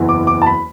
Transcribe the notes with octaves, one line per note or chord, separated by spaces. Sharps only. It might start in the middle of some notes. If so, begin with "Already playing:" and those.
Already playing: F#1 E2 E3
D6
D6
A5
B5